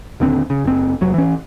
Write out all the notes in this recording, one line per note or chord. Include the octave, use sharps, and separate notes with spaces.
D#1 D#2 D3 C4
C#3
F#1 C4
F1 F#3
E3 C#4